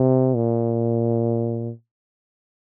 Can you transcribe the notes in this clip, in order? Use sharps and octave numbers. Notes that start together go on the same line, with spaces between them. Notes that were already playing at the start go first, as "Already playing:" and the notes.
Already playing: C3
A#2